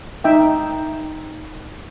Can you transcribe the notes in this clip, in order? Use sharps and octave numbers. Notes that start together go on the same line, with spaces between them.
D#4 E5 G5